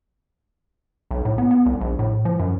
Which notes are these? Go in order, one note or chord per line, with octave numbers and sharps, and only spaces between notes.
B1
A2
B3
B3
C2
A#1
A2
F3
F#2